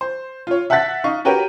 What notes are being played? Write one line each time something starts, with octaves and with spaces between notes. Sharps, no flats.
C5
F4 C#5
E5 F#5 A5 F#6 A6 B6
D#4 F5 C#6
F#4 G4 A#4 B4 C#5 G5